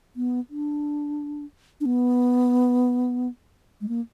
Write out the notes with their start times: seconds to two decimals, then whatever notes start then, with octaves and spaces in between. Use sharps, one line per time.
0.16 B3
0.50 D4
1.81 D4
1.86 B3
3.81 G#3
3.88 A#3